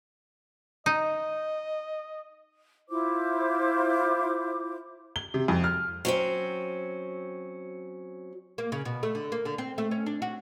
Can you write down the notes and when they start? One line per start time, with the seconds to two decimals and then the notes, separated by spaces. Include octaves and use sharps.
0.86 D#4 D#5
2.89 E4 F4 C5 D6
5.16 G7
5.34 C3
5.48 F2
5.64 F6
6.05 F#3 C4 C#4
8.58 A#3
8.72 C#3
8.85 B2
9.03 A3
9.15 D3
9.32 A#3
9.45 D3
9.58 C4
9.78 A3
9.91 C#4
10.06 D4
10.22 F#4